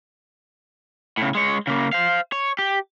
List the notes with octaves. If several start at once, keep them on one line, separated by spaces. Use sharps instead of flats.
A2 C#3
G#3 C#5
C#3 A#3
C5 F5
C#5
G4